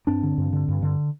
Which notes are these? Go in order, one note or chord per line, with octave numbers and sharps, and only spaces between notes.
G2 C4 D4
D3
G2
D3
G2
D3